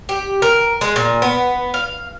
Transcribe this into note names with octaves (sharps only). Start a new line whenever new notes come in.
G4
A#4
G#3
A#2
B3
F5